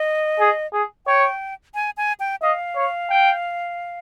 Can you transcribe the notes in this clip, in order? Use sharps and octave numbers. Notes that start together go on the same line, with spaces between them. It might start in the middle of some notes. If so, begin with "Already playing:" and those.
Already playing: D#5
G#4
G#4
C#5 G5
G#5
G#5
G5
D#5 F5
C#5
G5